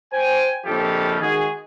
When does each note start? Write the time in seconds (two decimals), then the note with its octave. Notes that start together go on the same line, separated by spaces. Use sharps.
0.13 C5 G5 G#5
0.66 A#1 F2 C#3 F3 G4 A4
1.21 D#3 G#3 F#4 G#4